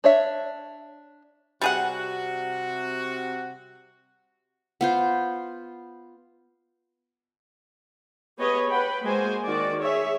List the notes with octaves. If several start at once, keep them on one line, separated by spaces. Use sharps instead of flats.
D4 C#5 E5
C3 G3 F#4 G#4 F#5
B3 F4 C5
B3 G4 G#4 B4 C#5 D#5
B4 F#5 G5 B5
G#3 A#3 F#4 C5 G#5
D#3 F#4 D5
G#4 C#5 E5